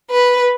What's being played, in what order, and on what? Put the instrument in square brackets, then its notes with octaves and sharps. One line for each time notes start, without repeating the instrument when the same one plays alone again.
[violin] B4